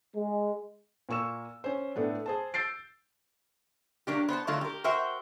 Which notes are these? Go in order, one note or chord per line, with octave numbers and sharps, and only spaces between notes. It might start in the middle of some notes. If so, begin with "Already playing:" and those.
G#3
A#2 A#3 C#6 E6 E7
C#4 C5
A2 A3 B3 D4
G#4 C5 A5
E6 G6 A6 C7 D7
F#3 A#3 D4 G4
B3 C5 F#5 A5
D3 D#3 F#3 A3 A#3 F4
G4 A#4
F#4 A#4 C5 E5 F#5 G5